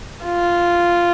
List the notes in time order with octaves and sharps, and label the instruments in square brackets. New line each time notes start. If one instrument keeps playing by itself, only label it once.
[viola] F4